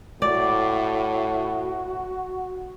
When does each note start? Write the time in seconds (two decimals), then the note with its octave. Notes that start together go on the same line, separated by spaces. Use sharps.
0.22 A2 F#4 D5